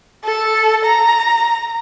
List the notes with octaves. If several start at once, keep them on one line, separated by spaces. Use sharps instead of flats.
A4
A#5